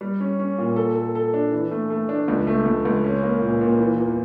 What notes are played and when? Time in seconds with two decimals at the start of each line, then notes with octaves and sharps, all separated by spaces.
0.01 G3
0.20 C#4
0.40 C#4
0.58 A#2
0.76 A4
0.96 A4
1.15 A4
1.34 D4
1.52 E3
1.71 A3
1.90 A3
2.09 D4
2.28 C#2
2.47 A3
2.66 C#2
2.85 C#2
3.04 C#4
3.23 A#3
3.42 A#2
3.61 A#2
3.79 E3
3.98 E2